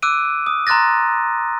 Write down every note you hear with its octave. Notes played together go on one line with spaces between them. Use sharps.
D6 E6 F#6 D7 D#7
D#6
A#5 C6 F#6 A6 A#6